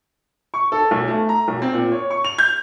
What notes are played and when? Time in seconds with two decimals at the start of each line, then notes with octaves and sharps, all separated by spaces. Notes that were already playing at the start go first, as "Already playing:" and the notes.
0.54 C#6
0.72 A4
0.91 B1
1.08 A3
1.29 A#5
1.48 B1
1.62 C4
1.74 A#2
1.92 C#5
2.11 C#6
2.25 F7
2.38 G6